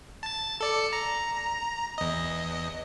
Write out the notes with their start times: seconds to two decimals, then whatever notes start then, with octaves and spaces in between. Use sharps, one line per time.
0.23 A5 A6
0.61 A4 D5 C#7
0.93 A#5
1.98 E2 D#5